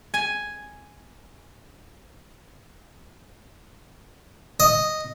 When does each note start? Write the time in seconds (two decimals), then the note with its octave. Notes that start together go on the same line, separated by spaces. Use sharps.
0.14 G#5
4.60 D#5